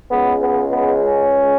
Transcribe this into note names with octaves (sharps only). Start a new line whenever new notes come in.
C#2 C#3 G#3 B3
B3
B3
C#4